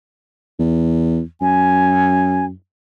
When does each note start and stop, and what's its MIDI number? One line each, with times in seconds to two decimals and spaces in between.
0.59 1.21 40
1.41 2.52 42
1.41 2.45 80